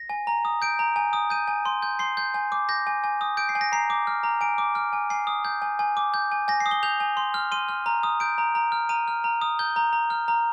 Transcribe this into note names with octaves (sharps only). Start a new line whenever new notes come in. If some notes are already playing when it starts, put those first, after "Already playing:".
Already playing: A#6
G#5
A#5
D#6
G6 D7
A#5
G#5
D#6
G6 D#7
G#5
C6
G6
C6 C7
G6
G#5
D6
G6 A#6
G#5
G#5
D#6
G6 D7
C7
G#5
A#6
A#5 C7
D6
F6
A#5
G#5 D7
D6
F6
G#5
G#5 C7
D#6
G6
G#5
G#5
D6
G6
G#5
G#5 A#6
C7
D#6
G7
G6 F7
G#5
C6
F6
C6 D#7
F6
A#5
D#6
G6 D7
A#5
A#5
F6
A#5 D#7
F6
A#5
D#6
G6 G7
A#5
A#5
F6
A#5